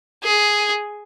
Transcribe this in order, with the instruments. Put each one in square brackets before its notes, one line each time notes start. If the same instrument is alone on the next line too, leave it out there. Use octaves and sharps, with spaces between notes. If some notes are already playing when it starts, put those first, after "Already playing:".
[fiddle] G#4